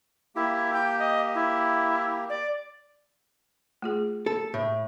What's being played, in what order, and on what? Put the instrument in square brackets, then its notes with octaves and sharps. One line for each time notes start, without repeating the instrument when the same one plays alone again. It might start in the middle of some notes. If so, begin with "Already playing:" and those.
[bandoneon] A#3 G4 [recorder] E4
[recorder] G5
D#5
E4
D5
[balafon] A3 F4 G#4
[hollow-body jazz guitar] A4
A2